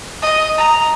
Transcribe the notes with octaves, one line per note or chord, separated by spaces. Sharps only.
D#5
A#5